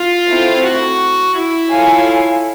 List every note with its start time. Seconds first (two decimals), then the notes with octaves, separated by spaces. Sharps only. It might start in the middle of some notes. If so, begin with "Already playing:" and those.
Already playing: F4
0.28 A3 C4 E4
0.63 F#4
1.35 E4
1.70 F4 A4 C#5 F5 G#5